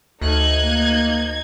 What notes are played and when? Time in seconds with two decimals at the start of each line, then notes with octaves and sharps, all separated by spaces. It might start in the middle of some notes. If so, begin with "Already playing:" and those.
0.21 D2 D#4 A4 F#6 G#6
0.58 A#3